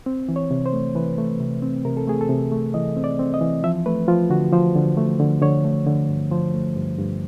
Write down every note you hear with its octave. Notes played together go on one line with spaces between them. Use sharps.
C4
E3
C#5
C3
C5
A3
E3 B4
A3
C3
C4
C3 A#4
A4
A3 G#4
A4
C3
A3
E3 D#5
C4
D5
C4
D#5
E3
F3 E5
A3 B4
F3 F4
D3 F#4
F3 C5
D3
A3
D3
D3 C#5
A3
D3
G2
F3 C5
A3
G2
G2